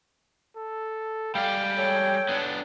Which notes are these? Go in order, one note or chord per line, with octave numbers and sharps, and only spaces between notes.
A4
G3 G#3 D5 F5 G5
A4 C#5
B3 D4